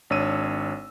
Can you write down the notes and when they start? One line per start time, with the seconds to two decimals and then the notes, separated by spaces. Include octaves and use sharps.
0.10 G#1 D4 C#5 E6 D#7